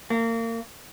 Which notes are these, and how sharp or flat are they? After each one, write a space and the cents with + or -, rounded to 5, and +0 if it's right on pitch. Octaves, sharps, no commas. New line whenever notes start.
A#3 -30